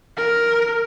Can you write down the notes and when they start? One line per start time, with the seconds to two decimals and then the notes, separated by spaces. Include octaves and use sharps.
0.17 A#4